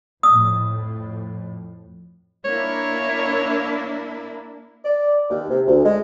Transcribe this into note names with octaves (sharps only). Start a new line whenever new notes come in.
F2 A2 D#6
A#3 D4 E4 C#5
D5
D#2
C3
D2
G#3